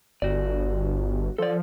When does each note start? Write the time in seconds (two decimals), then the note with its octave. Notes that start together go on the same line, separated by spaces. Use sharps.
0.22 G1 F#4 D5
1.38 F3 A4 D5